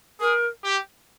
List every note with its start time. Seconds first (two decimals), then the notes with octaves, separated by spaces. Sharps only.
0.20 G#4 A#4
0.64 G4